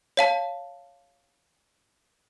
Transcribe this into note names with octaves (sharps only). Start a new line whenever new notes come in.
C#5 F5 A5